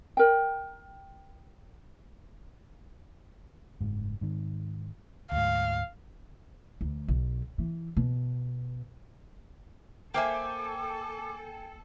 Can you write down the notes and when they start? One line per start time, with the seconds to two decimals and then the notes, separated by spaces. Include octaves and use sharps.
0.17 A#4 G5
3.81 F#1 G#2
4.21 G#2 D#3
5.32 D2 G#2 F5
6.81 D2
7.08 B1
7.58 E3
7.97 B2
10.14 A#3 A4 C5 E5 G5 G#5 D6